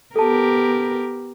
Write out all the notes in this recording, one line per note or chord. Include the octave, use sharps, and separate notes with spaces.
B3 G4 A4 A#4 A5